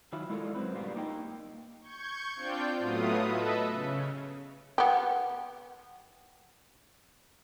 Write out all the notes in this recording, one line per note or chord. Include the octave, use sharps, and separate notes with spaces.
D#3 F#3 E4 F4
G#3 E4 F4 A4 A#4 D5
F#2 F#3 C4 B4
G2 A#2 G3 A#3 B3
A#3 D#4 G5
C#6 G6 G#6
C4 D4 F4 D5 G5 G6
A2 F#3 A3 B3 F4 D#6
A4 B4 D#5 E5
C#3
B3 G4